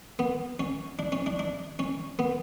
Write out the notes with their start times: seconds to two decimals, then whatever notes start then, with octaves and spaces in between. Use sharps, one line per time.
0.19 B3
0.60 C#4
0.99 D4
1.12 C#4
1.26 D4
1.39 D4
1.79 C#4
2.19 B3